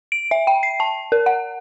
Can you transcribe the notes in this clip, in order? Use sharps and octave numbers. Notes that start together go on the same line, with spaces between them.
D7
E5
G5
C7
A5
A#4
F#5